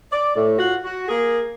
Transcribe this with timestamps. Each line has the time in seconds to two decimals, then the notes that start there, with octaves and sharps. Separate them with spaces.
0.13 D5
0.36 A2
0.59 F4 F#4 F#5
0.84 F#4
1.08 A#3 G#4